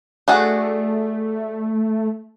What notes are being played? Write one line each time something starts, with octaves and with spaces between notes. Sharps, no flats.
A3 D4 F#4 G#4